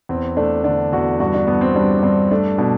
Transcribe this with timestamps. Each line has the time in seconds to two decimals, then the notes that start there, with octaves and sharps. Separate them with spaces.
0.09 E2 C4
0.37 A3 D4
0.64 D3 D4
0.93 E2 F#4
1.20 G2 F#4
1.34 D4
1.47 G2 B3
1.61 C4
1.75 G3 D4
1.99 D4
2.03 G2 C4
2.31 A3 D4
2.58 B2 D4